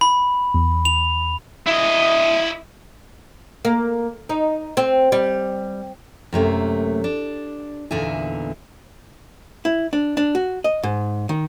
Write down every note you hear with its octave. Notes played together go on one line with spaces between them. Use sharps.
B5
E2
F7
E4 D#5
A#3
D#4
C4
G3
F#2 C3 A3 A#3
D4
E2 A#2 D3 D#4 E5 G#5
E4
D4
D4
F#4
D#5
G#2
D#3